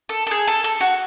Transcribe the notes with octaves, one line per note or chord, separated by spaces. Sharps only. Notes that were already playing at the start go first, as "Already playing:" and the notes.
A4
A4
G#4
A4
A4
F#4